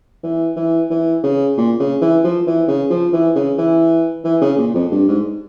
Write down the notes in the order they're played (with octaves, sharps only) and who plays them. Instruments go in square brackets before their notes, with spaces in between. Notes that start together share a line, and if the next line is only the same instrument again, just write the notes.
[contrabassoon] E3
E3
E3
C#3
A#2
C#3
E3
F3
E3
C#3
F3
E3
C#3
E3
E3
C#3
A#2
F2
G2
G#2